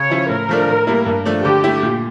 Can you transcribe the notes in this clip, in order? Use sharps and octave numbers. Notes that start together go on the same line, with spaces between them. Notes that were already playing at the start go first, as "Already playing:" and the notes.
Already playing: C#3 C#5
F3 C#4 E4
A2 A#4
F3 A3 D4
A2
G3 A#3 E4
G2
F3 A3 D4
D3 G4
A3 E4
A#2